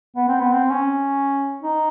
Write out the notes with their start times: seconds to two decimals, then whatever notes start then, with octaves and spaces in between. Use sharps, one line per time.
0.16 B3
0.28 C4
0.40 B3
0.52 C4
0.70 C#4
1.62 D#4